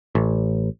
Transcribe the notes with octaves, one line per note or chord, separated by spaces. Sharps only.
A1